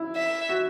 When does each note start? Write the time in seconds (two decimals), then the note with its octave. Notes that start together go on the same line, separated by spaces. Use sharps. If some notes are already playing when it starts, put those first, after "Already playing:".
Already playing: E4
0.16 E5
0.49 F#4